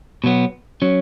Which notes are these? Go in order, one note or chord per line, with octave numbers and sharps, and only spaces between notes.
B2 F#3 B3
F#3 C#4